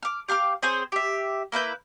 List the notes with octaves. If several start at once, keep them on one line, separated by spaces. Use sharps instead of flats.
D6 F6
G4 F5 D6 F6
C4 G#4 C5 C#5
G4 E5
A#3 E4 B4 G6